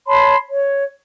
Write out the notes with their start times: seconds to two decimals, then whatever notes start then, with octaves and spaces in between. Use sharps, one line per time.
0.06 C#5 A5 B5 C6
0.50 C#5